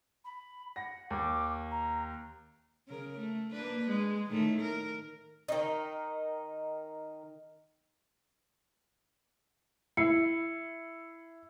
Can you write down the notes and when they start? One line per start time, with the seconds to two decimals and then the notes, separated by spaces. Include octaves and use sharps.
0.25 B5
0.76 F#5 A#6
1.10 D#2 D6
1.71 A#5
2.88 C#3 A#4
3.19 A3
3.52 A#3 D4 B4
3.89 G#3
4.30 A2 D#3 A3
4.62 A#4
5.48 D#3 D#4
9.97 E4 C7 C#7